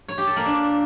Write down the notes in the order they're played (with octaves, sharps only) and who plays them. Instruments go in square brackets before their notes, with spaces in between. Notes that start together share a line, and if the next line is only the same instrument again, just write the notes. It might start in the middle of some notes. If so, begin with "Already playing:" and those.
[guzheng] C#5
G4
A4
A#3
D4